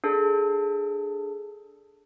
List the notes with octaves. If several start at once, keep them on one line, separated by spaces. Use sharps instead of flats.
D4 G#4 A4